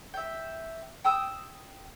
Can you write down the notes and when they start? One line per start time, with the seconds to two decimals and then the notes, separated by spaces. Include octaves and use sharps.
0.14 E5 G5
1.04 G5 D#6 E6